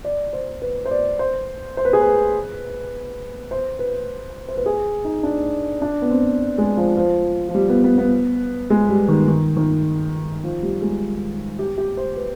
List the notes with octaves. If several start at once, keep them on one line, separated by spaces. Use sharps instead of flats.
D5
C5
B4
C5
D5
C5
C5
B4
G#4
B4
C5
B4
C5
B4
G#4
D#4
D4
D4
B3
C4
G#3
F3
F3
F3
G3
B3
B3
B3
G#3
G3
D#3
D#3
D#3
F3
G3
G#3
G4
G4
C5
B4